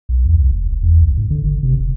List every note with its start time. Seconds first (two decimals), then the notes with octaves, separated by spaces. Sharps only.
0.09 B1
0.25 E2
0.36 C2
0.51 F1
0.71 F1
0.83 E2
1.01 C#2
1.17 G#2
1.30 D3
1.44 G1
1.63 C3
1.79 F1